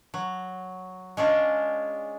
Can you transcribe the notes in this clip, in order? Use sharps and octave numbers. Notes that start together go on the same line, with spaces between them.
F#3
G#3 C#4 D4 F4